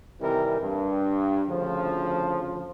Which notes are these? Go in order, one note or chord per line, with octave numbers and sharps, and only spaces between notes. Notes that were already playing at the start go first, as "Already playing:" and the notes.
C3 D#3 E3 G3 A#4
G2
D2 C#3 F3